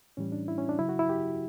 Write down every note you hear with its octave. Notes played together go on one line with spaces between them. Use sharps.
A2 E3 G3 C#4
D4
E4
C#4
D4
C#3 F#3 E4
F#4
E4
G4